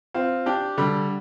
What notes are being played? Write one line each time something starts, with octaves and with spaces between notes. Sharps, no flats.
C4 F4
D4 G4
D3 G3